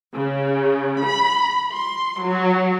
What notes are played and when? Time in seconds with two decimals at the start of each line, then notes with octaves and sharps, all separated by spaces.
0.14 C#3
1.04 B5
1.72 C6
2.22 F#3